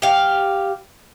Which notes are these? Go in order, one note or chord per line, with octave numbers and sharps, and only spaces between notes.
G4 F5